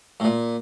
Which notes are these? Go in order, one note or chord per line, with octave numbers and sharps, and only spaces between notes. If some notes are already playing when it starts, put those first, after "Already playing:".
A2
A#2